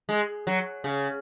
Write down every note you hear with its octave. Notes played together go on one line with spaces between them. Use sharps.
G#3
F#3
C#3